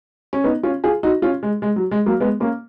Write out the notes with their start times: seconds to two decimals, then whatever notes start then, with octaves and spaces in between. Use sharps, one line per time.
0.33 C#4
0.44 B3 D#4
0.63 C#4 F4
0.84 F4 G#4
1.03 D#4 F#4
1.22 C#4 F4
1.43 G#3
1.62 G#3
1.76 F#3
1.91 G#3
2.06 F#3 A#3
2.20 G#3 B3
2.40 A#3 C#4